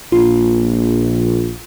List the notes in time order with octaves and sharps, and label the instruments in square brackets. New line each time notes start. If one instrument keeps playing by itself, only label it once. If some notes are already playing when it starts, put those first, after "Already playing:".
[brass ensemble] A#1 [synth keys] F4